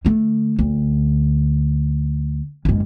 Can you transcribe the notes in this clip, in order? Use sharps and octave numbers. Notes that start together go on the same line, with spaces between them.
D3 A3
D2
F#1 G#2